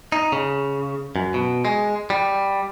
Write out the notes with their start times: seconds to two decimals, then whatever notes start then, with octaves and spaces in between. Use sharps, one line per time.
0.12 D#4
0.32 C#3
1.16 F#2
1.34 B2
1.65 G#3
2.10 G3